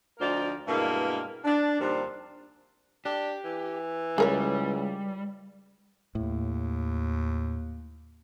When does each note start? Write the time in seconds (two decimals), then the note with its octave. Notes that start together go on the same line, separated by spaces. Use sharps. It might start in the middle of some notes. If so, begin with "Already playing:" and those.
0.19 D2 F3 D#4 A#4 C5 D5
0.68 G2 B2 G#3 A#3 E4 A#4
1.44 D4
1.80 D#2 C3 F3 G3 D4
3.05 D4 G4
3.44 E3
4.18 C#2 G3 G#4 A#4 C#5
6.15 D#2 A2